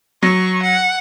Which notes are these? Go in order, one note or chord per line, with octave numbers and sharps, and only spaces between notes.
F#3 C#6
F#5